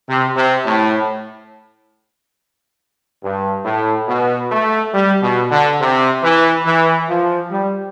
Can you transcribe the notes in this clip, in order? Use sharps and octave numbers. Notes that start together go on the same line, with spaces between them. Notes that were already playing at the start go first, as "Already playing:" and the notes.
C3
C3
A2
G2
A2
B2
A3
G3
B2
D3
C3
E3
E3
F3
G3